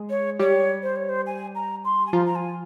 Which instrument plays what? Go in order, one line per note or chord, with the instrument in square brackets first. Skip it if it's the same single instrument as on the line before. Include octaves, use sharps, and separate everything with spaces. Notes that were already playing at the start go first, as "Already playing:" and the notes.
Already playing: [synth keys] G#3 G#4
[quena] C#5
[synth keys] G3 G4 [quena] C#5
[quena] C5
C#5
C5
G#5
A#5
C6
G#5
[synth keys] F3 F4 [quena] A#5
[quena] A#5
G#5